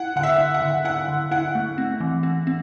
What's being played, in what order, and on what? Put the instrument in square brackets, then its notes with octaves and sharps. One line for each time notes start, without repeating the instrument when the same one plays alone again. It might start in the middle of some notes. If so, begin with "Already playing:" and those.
Already playing: [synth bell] E4 [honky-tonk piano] F#5
[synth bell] D3 [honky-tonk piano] F#5
[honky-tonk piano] E5
[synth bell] D3
[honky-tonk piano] F#5
[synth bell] D3
[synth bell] E4 [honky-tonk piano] F#5
[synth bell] D3
[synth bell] E4 [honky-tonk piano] F#5
[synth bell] A3
C4
E3
C4
C4